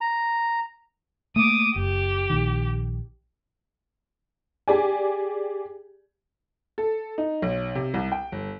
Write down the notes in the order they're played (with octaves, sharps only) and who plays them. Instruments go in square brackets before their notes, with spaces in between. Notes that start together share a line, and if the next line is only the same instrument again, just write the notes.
[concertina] A#5
[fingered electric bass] A3 A#3 [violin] D6 D#6
[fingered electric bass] F#1 [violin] G4
[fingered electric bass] A#1 D#3
[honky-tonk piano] G4 G#4 D5 G#5
A4
D#4
B1
C3
C2
G5
G1